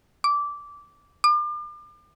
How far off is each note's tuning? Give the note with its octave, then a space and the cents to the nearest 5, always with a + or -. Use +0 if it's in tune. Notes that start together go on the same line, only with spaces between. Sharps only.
D6 -15
D6 +35